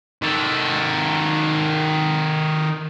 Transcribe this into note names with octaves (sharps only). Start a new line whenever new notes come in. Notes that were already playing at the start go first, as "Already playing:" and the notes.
D#3 A4